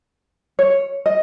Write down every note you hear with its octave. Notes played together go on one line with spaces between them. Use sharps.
C#5
D#5